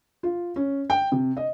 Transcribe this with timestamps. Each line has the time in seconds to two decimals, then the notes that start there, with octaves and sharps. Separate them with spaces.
0.23 F4
0.56 C#4
0.90 G5
1.12 C3
1.37 D#5